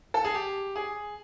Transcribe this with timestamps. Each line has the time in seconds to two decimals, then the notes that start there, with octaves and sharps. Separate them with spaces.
0.14 A4
0.25 G#4
0.35 G4
0.76 G#4